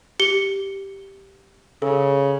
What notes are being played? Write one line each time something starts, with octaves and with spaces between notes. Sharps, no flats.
G4 C#7 G7
C#3 A4